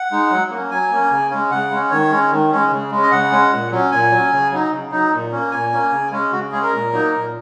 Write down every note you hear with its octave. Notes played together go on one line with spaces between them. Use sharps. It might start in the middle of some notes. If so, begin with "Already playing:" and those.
Already playing: F#5
G#3 D#4
F#3
A#3 C#4
F#3 G#5
A#3 C#4
C#3
G#3 C#4
C#3 F#5
G#3 C#4
D#3 C#5
G#3 C#4
D#3
G#3 C#4
C#3
G#3 C#4
D#5
C#3 F#5
G#3 C#4
A#2
F#3 C#4
A#2 G#5
F#3 C#4
C#3
F#3 D#4
C#3
F#3 D#4
A#2
A#3 C#4
A#2 G#5
A#3 C#4
C#3
G#3 C#4
C#3 F#4
G#3 C#4 G#4
A#4
A#2
F#3 A#3 D#4
A#2